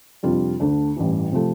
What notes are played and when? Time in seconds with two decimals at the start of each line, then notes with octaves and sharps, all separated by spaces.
0.23 F2 C3 G3 D4 F4
0.60 D2 D3 A3 D4
0.97 A1 G2 E3
1.32 C3 F3 A3